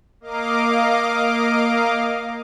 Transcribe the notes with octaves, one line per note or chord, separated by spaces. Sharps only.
A#3 D#5 F5 D6